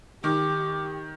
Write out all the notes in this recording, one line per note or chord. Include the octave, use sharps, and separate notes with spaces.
D#3 G4 D6